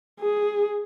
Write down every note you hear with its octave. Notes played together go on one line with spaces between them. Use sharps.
G#4